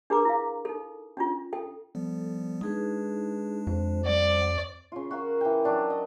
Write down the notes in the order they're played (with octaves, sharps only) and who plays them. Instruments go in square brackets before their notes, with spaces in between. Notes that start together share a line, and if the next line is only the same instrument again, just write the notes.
[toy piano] D4 G#4 A#4 B4 A#5 D6
E4 F5
D#4 A4
C#4 D4 F4
A4 G5
[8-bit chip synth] F3 G3 B3 [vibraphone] A4
[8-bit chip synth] G#3 D4 [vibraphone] D#4 G#4 B4
[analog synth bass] F2 [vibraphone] C5
[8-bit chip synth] G3 F#5 [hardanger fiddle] D5
[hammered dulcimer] C#3 F4
F#4 A#4 F5
E3 G5
F#3 D4 D5
D#5